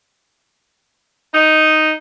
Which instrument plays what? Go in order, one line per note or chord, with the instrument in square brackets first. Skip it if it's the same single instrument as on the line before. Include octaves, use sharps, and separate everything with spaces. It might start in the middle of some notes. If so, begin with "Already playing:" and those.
[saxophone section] D#4